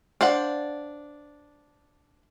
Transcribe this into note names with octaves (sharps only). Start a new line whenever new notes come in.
D4 C5 D5 F5 F#5